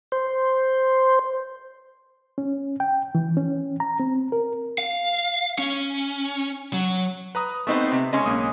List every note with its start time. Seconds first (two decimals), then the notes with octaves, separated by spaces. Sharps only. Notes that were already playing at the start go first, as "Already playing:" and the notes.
0.12 C5
2.38 C#4
2.80 G5
3.15 E3
3.37 C#4
3.80 A#5
4.00 C4
4.32 A#4
4.78 F5
5.59 C#4
6.73 F#3
7.35 B4 A#5 D#6
7.67 A3 B3 C4 D#4 B4 C5
7.92 C3
8.13 C#3 G#3 C#4 D#5 C#6
8.26 B1 A#3 D#6